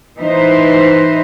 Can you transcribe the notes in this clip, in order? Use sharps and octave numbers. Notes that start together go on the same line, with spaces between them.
E3 D#4 B4 C5